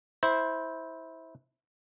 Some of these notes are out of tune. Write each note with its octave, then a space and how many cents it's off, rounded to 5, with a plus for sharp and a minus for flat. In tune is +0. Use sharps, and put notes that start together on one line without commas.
E4 -15 C5 +0